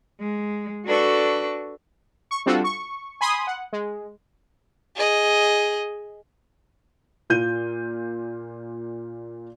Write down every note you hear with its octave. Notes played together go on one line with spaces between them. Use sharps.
G#3
D4 F#4 A4 B4 C#6
C#6
G3 C4 D4 F4 F#4 A4
C#6
G#5 B5 C6 D#6
F#5
G#3
G#4 D#5
A#2 F4 G6 D#7